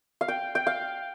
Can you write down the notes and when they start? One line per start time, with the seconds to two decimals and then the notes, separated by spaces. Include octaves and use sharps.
0.21 F5
0.28 G5
0.55 G5
0.67 F5